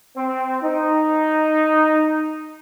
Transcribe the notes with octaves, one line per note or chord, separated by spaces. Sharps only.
C4
D#4